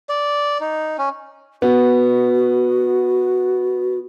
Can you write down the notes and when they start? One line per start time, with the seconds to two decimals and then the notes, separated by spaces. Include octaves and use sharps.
0.09 D5
0.61 D#4
0.98 C#4
1.62 B3 F#4